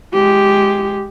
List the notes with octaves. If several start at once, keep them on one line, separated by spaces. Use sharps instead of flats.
G#3 G4